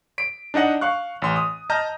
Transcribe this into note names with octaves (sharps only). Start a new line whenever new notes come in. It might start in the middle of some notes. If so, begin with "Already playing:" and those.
B6 D7
D4 D#4 D#5 F#5
F5 C#6 F#6
A1 C6
D#6
D#5 A5 A#5 F6 G6 A#6